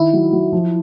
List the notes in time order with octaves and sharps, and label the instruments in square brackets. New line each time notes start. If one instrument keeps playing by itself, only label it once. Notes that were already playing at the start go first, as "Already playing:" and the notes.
Already playing: [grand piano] D#3 [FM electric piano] E4
[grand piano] F#3
F#3
F3